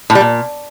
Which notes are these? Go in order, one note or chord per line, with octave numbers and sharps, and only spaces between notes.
A2
G3
A#2